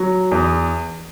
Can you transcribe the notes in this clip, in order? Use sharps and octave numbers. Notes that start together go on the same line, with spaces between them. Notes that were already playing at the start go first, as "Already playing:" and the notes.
Already playing: F#3
E2